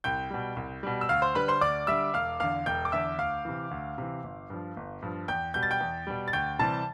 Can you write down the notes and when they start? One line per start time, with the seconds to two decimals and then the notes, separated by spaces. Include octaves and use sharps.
0.04 C2 G5 G6
0.31 B2 G3
0.56 C2
0.83 B2 G3
1.01 E6
1.09 D2 F5 F6
1.22 C5 C6
1.35 D3 G3 B4 B5
1.48 C5 C6
1.61 D2 D5 D6
1.87 D3 G3 E5 E6
2.14 E1 F5 F6
2.40 E2 D3 F5 F6
2.66 E1 G5 G6
2.85 D6
2.92 E2 D3 E5 E6
3.18 D2 F5 F6
3.45 C3 E3
3.71 D2
3.98 C3 E3
4.24 G1
4.50 G2 F3
4.77 G1
5.02 G2 F3
5.28 E2 G5 G6
5.54 B2 G3 G6
5.63 A6
5.71 G5 G6
5.80 E2
6.07 B2 G3
6.28 A6
6.33 D2 G5 G6
6.59 C3 E3 G3 A5 A6